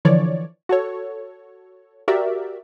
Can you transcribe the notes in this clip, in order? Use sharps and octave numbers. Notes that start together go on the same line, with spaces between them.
D3 E3 F3 C#5 D5
F#4 A4 C#5
F#4 G4 A#4 D5 E5